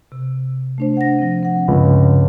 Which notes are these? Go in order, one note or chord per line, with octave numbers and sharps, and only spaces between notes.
C3
A3 D4 C5
F#5 A#6
F3 C4
C4 F#5
C#2 G2